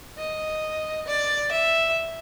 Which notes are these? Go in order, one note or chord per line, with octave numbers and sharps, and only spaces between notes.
D#5
D5
E5